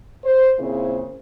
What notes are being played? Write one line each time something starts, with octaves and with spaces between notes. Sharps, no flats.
C5
A#2 C#3 C4 E4 G#4 C5